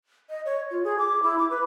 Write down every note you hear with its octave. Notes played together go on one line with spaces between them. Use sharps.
D#5
C#5
F4
G#4
D6
E4
D6
B4